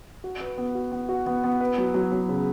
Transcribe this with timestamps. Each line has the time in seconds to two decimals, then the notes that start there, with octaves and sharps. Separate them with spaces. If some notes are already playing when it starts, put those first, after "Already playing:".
0.24 F#4
0.40 B4
0.58 B3
0.75 F#4
0.92 B3
1.09 F#4
1.26 B3
1.44 B3
1.61 B4
1.78 F#3
1.94 F#3
2.12 F#3
2.29 C#3